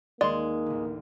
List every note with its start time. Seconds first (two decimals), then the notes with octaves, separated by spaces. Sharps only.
0.21 D#2 D#3 G#3 A#3 D5 C6
0.66 A1 D2